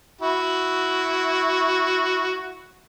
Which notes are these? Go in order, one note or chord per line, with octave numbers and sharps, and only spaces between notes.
E4 F#4